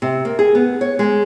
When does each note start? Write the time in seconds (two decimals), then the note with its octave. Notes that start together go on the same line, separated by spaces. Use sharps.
0.02 C3
0.25 A#3
0.39 G#4
0.55 B3
0.81 C#5
0.99 G#3